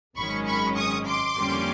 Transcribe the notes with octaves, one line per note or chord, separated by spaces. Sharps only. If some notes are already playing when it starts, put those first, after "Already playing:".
G#1 F#2 D#3 G#3 C#4 B5 C#6
B5 C#6
C#6 D#6
C6 D6
F2 D3 G3 A#3 C#4